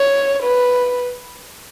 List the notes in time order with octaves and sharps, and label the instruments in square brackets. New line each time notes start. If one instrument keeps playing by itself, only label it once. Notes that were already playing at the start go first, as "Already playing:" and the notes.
Already playing: [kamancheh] C#5
B4